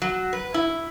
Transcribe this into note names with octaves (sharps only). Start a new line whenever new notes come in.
F#3
B4
E4